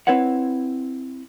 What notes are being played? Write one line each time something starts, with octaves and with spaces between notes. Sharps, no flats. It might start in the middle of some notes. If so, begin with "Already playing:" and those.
C4 E4 B4 C#5 F#5